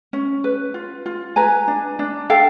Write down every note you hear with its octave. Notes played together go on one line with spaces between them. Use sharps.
C#4
B4
F4
F4
B4 G#5 A#5
D4
D4
A4 F5 G5